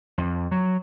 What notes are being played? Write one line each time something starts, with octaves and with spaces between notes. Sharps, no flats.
F2
F#3